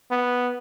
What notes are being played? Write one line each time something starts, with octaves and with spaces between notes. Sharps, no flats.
B3